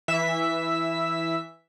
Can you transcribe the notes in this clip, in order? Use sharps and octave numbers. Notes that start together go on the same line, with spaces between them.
E3 E5 B6